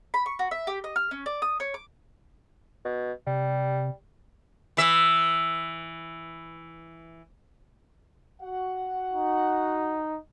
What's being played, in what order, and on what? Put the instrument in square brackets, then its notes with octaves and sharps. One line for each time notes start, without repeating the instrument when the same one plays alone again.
[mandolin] B5
C#6
F#4
E5
G4
D#5
F6
C#4
D5
D#6
C#5
D6
[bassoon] B2
[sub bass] C3 [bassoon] G3
[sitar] E3 E5
[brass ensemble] F#4 F#5
[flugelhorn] D#4